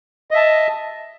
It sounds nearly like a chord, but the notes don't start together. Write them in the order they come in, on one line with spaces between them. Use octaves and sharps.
D#5 E5 A5